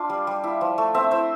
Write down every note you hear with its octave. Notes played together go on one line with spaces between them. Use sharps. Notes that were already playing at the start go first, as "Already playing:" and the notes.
Already playing: D4 F4 F5
G3
G3
E4
F3
A3
C4 E5
E4 C5